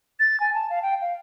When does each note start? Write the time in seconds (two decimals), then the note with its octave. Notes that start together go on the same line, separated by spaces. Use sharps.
0.19 A6
0.40 G#5
0.54 A5
0.70 F5
0.82 G5
1.01 F5